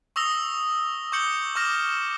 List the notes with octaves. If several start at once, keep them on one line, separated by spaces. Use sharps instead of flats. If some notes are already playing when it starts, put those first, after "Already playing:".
C#6 D#6 E6 A#6 F7 G7
C#6 D6 G6 C#7 F#7 G7
C#6 D6 F6 A#6 E7